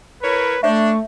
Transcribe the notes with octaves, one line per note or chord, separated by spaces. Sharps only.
E4 A#4 B4 C#5
A3 D4 C#5 E5 C#6